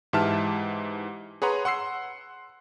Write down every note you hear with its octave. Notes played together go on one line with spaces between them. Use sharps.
G#2 E3 G4 E5 A5 F6
G#4 B4 C#5 F#5 A#5 C6
F#5 C6 E6 C7